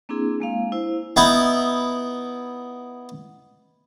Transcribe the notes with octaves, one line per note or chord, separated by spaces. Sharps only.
A#3 C4 D4 E4 G#4
G#3 A#3 F5
E4 C5
B3 D#4 E4